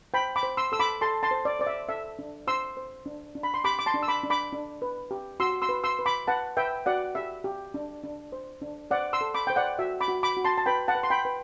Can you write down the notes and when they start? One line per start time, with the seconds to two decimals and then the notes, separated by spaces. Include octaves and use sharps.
0.14 C5 G5 B5
0.36 B5 D6
0.43 C5
0.57 C6 E6
0.72 A4 E6
0.79 B5 D6
1.01 A4 A5 C6
1.23 A5 C6
1.31 C5
1.45 D5
1.59 C5 D5
1.67 E5
1.89 A4 E5
2.19 D4
2.47 C5 C6 E6
2.77 C5
3.06 D4
3.35 D4
3.43 B5
3.54 C6
3.64 G4 B5 D6
3.79 D6
3.86 A5 C6
3.94 D4
4.03 E6
4.08 B5 D6
4.23 D4
4.30 B5 D6
4.53 D4
4.82 B4
5.11 G4
5.40 F#4 C6 E6
5.62 C6 E6
5.69 B4
5.84 C6 E6
5.99 B4
6.06 B5 D6
6.27 B4 F#5 A5
6.57 B4 E5 G5
6.86 F#4 D5 F#5
7.15 G4 E5
7.44 G4
7.74 D4
8.03 D4
8.32 C5
8.61 D4
8.91 C5 D5 F#5
9.13 C6 E6
9.21 A4
9.34 B5 D6
9.47 C5 G5
9.56 D5 F#5
9.79 F#4 E5
10.01 B5 D6
10.08 F#4
10.23 B5 D6
10.37 F#4
10.44 A5 C6
10.58 A5
10.66 B4 G5 B5
10.88 F#5 A5
10.95 B4
11.03 C6
11.10 G5 B5
11.25 B4